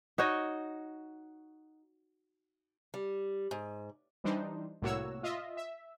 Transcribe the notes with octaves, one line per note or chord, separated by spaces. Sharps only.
D#4 F#4 C#5 D#5
G3
G#2
E3 G3 D4 D#4 C5
C2 A2 A#3 F#4 C#5 E6
F4 D#5 E5
E5